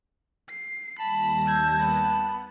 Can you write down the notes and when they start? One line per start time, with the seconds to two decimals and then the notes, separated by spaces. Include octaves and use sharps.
0.49 C7
0.99 D#2 G3 A5 B5 A#6
1.47 E6 G6 G#6
1.79 B3 B5